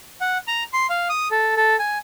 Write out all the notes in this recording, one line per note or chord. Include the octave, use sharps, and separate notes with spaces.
F#5
A#5
C6
F5
D#6
A4
A4
G#5